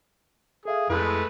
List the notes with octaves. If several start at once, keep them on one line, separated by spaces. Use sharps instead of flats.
G#4 A4 E5 F5
F2 G#3 A3 E4 B4